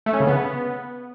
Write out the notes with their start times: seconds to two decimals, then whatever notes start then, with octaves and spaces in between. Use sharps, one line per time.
0.06 A3
0.13 C#4
0.20 C#3
0.27 B3